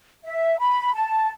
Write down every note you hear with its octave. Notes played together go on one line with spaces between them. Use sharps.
E5
B5
A5